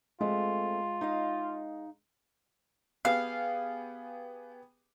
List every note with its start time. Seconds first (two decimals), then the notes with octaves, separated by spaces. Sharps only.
0.21 G#3 A3 C4 F4
1.01 D#4 D#5 F5
3.05 B3 G4 G#4 F5